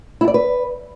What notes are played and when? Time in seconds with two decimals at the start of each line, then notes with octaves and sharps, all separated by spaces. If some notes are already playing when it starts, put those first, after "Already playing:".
0.21 E4
0.28 D5
0.34 B4